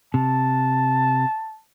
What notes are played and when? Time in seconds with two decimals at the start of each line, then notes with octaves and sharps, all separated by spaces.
0.14 C3 A5